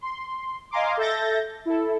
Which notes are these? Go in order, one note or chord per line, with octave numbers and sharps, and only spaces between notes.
C6
D#5 F5 G#5 A#5 C6 D6
A4 E5 G6 A6 A#6
E4 A4